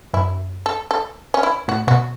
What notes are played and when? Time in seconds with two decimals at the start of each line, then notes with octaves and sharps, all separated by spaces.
0.14 F#2 E4
0.66 A4
0.91 A4
1.34 C#4
1.43 E4
1.68 A2 F#4
1.87 B2 F#4